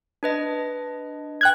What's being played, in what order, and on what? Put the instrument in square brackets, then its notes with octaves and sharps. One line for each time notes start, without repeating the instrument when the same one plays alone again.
[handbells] D4 B4 D#5
[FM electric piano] G5 F#6 G#6